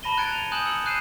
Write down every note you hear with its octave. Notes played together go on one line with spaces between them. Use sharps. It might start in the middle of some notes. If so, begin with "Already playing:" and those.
A5 B5 A#6 D#7 G7
A#5 F#6 G#6 A6 C#7 D7
D#7 F7
G#5 D#6 F#6 G6 E7 F#7
E6 C#7 F#7
D#6 F#6 G6 C7 D#7 E7